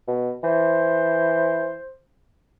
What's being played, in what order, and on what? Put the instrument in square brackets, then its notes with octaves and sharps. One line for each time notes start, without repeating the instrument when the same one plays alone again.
[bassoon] B2
[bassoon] E3 [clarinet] C5